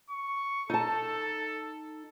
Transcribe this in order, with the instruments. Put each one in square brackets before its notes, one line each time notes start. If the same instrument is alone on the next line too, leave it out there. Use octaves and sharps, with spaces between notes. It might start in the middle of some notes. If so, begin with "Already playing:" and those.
[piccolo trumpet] C#6
[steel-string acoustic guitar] D#4 A5 [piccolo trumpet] A4